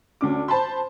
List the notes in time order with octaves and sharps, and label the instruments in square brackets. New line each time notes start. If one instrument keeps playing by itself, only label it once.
[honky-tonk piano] D2 C#4 D6
C5 A5 B5 C6